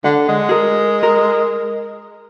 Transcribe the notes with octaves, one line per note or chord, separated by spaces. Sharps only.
D3 F#5
G#3
G#4 A#4
A#4